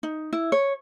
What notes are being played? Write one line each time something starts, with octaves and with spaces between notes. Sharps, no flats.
D#4
E4
C#5